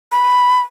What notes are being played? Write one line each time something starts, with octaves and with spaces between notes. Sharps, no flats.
B5